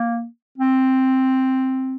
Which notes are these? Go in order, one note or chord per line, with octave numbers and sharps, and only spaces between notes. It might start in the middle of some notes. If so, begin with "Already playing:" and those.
Already playing: A#3
C4